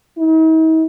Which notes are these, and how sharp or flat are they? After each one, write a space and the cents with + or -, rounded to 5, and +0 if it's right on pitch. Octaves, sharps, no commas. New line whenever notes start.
D#4 +45